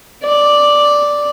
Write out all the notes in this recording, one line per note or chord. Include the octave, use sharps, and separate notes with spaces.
D5